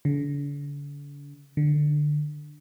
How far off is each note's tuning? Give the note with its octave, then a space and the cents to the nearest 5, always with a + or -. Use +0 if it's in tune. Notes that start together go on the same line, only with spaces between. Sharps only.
D3 -40
D3 +15